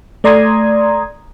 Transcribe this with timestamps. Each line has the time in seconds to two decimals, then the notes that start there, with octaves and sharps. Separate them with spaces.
0.24 A3 D5 A#5 C6 D#6 G#6